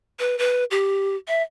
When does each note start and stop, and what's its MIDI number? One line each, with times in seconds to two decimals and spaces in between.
0.19 0.38 71
0.38 0.64 71
0.71 1.16 67
1.28 1.42 76